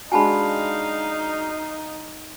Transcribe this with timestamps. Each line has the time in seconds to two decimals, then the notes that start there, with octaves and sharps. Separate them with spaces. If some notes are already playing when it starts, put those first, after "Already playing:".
0.12 G#3 D4 D#4 F#4 F5 G#5 A5 B5